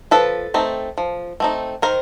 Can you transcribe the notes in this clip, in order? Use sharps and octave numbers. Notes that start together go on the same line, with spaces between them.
F3 A4 B4
A3 C4 D#4
F3
A3 C4 D#4
D#3 A#4 C5